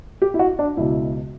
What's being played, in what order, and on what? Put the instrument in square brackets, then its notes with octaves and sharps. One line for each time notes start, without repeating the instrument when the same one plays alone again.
[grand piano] G4
E4
F#4
D4
C#2 B2 E4